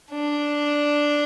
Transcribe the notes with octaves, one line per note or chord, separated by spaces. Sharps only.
D4